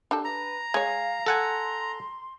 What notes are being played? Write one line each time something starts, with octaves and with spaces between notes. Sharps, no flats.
D4 G4 A4
B4 A#5
G#3 C#5 F5 G#5
A4 F#5 G#5 C6